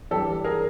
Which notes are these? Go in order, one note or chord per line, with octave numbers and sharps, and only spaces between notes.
G2 E3 G4 A4
G#4 A#4